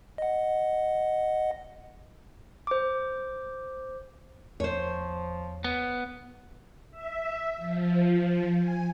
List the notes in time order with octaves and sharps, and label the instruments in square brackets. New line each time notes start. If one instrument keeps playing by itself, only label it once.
[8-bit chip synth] D#5 F#5
[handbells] C5 D6
[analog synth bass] E2 [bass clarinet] F3 [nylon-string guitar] C5 C#5
[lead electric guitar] B3
[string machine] E5
F3
G#5